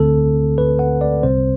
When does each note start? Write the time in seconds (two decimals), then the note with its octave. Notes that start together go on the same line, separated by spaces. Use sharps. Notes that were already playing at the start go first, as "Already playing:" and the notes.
Already playing: D2 D3 A3 C4 A4
0.58 B4
0.79 F#5
1.01 D5
1.23 C2 C3 G3 C4 C5